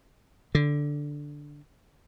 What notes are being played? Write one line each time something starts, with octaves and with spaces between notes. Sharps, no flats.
D3